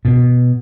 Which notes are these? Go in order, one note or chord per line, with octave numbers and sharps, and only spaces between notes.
B2